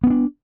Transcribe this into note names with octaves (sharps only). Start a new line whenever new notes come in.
B3 C#4 D4